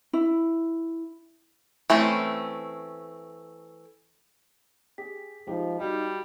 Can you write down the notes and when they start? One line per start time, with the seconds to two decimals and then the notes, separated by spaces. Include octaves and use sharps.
0.13 E4
1.90 E3 A3 C4 C#4
4.98 G4 G#4 B6
5.47 F3 G#3 D#4 G4
5.80 G3 D#4 F#4 G4 F5